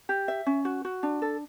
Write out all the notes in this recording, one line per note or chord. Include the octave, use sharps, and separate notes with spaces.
G4
E5
C#4
F#4
F#4
D4
A4